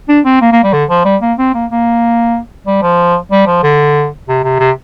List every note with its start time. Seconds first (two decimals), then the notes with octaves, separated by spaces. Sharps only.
0.09 D4
0.25 C4
0.41 A#3
0.52 A#3
0.63 G3
0.73 D3
0.89 F3
1.05 G3
1.22 A#3
1.39 C4
1.54 A#3
1.70 A#3
2.66 G3
2.82 F3
3.31 G3
3.47 F3
3.63 D3
4.28 C3
4.44 C3
4.59 C3